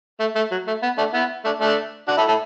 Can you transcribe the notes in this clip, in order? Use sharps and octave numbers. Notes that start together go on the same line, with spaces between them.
A3
A3
F#3
A3
B3
A3 D4
B3 E4
A3 D4
A3 D4
D4 F#4
E4 A4
E4 A4